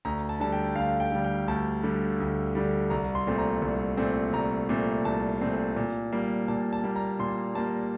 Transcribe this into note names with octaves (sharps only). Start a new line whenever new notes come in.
D2 A#5
A5
D3 G3 A5
G5
D2 F5
G5
D3 G3
G5
D2 A5
D3 G3
D2
D3 G3
C2 A#5
C6
A#2 A3 C4
A#5
C2
A#2 A3 C4
C2 A#5
A#2 A3 C4
C2 A5
A#2 A3 C4
A#2
G3 A#3
A#2 A5
A5
G3 A#3
A#5
A#2 C6
G3 A#3 A5